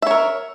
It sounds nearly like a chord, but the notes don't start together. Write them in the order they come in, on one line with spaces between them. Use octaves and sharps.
E5 C#5 A#4